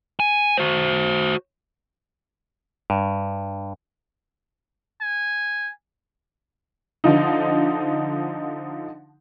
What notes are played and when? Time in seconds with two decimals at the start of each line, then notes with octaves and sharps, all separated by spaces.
0.20 G#5
0.57 F#4 C5
2.90 G2
5.01 G#5
7.04 D3 F3 D#4